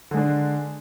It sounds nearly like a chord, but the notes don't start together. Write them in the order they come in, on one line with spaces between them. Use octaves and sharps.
D3 G#3 D4